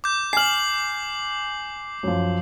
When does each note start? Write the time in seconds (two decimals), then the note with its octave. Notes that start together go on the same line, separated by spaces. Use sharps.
0.04 D6 G6
0.33 G#5 F6 C7 F#7
2.03 F#2 F3